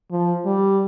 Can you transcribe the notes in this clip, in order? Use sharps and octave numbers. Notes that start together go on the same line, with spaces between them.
F3
G3